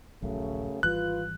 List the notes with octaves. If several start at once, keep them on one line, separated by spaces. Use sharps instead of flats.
D#1 A#1 F#2 C#3 F#3 A3
G#1 E3 G3 F4 B4 F#6